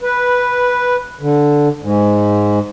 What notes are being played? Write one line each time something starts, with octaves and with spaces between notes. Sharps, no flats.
B4
D3
G#2